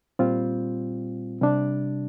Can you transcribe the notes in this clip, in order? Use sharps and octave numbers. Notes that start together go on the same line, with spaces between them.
A#2 G3 C4 F4
C3 G3 D4